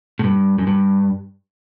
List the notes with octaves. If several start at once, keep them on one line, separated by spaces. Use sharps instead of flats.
A2
G2
F#2
G2